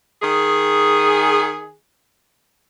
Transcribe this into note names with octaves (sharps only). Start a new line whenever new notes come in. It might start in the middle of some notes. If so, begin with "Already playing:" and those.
D#3 G#4